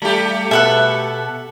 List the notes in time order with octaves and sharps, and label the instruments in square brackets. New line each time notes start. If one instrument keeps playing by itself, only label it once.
[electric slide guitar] G3 [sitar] A3 G4
[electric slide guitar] B2 E5 [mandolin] A4 B4 F#5